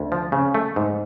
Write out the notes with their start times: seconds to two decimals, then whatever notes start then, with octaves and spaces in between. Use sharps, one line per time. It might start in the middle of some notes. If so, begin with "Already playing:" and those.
Already playing: D2
0.12 F3
0.32 C#3
0.54 A3
0.76 G#2